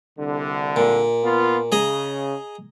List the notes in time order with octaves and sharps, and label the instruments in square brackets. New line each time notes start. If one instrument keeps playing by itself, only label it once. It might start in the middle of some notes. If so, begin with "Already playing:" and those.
[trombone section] C2 D3
[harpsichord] A#2
[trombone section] B3 F4
[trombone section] C#3 [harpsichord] G#4 D#5 A#5